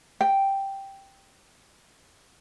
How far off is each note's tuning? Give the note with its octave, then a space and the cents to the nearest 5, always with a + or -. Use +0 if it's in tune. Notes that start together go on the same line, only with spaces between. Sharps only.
G5 +0